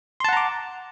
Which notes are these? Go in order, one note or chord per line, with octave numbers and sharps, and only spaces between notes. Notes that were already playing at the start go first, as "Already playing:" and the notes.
F#5 A5 A#5 C6 D6